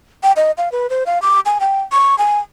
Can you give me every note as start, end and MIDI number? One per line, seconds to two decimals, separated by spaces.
0.23 0.32 79
0.36 0.51 75
0.58 0.71 77
0.72 0.89 71
0.90 1.04 72
1.06 1.21 77
1.22 1.40 86
1.46 1.58 80
1.60 1.81 79
1.92 2.18 85
2.18 2.40 80